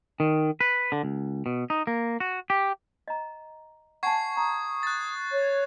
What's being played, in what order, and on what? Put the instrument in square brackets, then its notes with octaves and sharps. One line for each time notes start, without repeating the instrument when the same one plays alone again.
[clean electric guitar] D#3
B4
D3
C#2
B2
D#4
A#3
F#4
G4
[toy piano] D#5 A#5
[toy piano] F#5 G#5 A5 [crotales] C#6 G#6 C7
[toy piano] A#5 [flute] D#6
[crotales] F#6 A6
[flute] C#5